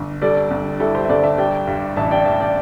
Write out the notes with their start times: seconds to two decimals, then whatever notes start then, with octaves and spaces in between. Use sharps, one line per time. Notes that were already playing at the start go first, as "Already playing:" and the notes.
Already playing: G1
0.22 G3 A4 D5
0.51 G1
0.80 G3 E4 A4
0.95 G4 C5
1.05 E5
1.09 G1 A4 D5
1.24 E5 A5
1.38 G3 D5 G5
1.67 G2
1.96 A1 E5 A5
2.11 D5 G5
2.25 A1 E5 A5
2.40 D5 G5